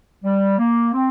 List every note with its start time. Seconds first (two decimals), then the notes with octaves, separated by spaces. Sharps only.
0.24 G3
0.59 A#3
0.94 C4